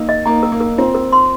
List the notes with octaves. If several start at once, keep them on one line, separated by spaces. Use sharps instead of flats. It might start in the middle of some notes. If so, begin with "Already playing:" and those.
Already playing: A#3 D#4 A#4
D#5
A#3 D#4 A#5
A#4
A#3
A#4
C4 F4
A#4
C6